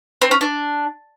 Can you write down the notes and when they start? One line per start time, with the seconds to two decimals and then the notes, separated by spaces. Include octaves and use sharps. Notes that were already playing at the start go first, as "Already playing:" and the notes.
0.22 C4
0.31 C#4
0.41 D4